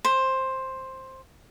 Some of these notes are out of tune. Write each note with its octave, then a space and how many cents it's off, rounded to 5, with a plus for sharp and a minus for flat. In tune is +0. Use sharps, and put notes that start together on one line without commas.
C5 +10